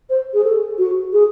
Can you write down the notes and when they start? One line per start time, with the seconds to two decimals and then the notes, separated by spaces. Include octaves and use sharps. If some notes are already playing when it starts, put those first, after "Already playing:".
0.09 C5
0.34 G#4
0.44 A4
0.78 F#4
1.13 G#4